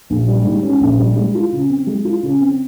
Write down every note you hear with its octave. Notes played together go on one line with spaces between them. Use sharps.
A#1
G3
G#2
C#4
A#1
G3
G#3
F4
C#3
C4
G#3
F4
C#3
C4